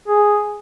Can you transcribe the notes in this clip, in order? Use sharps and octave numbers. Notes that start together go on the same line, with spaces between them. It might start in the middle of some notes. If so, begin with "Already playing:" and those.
G#4